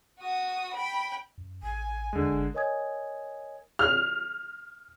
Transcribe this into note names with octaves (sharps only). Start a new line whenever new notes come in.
F#4 D#6
G5 B5
F#2
A1 G#5
E2 D3 G#3
G1
A#4 C#5 D#5 G#5 D#6 G#6
F6